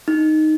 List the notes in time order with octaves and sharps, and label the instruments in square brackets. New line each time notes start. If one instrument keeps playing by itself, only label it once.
[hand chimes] D#4